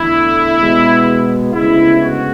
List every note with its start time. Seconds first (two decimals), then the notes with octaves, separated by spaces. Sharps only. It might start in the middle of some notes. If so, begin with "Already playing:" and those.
Already playing: E2 D3 A3 E4
0.58 B2 G#3 B3
1.53 D2 C#3 G#3 B3 E4
2.00 F#4